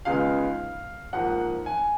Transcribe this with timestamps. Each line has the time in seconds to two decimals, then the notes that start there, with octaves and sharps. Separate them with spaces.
0.05 C#2 C#3 G#3 B3 D#4 F5
1.13 G#2 F3 A#3 F#5
1.66 G#5